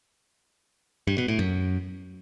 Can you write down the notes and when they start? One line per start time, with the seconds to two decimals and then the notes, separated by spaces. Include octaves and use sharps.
1.07 G2
1.18 B2
1.28 A2
1.39 F#2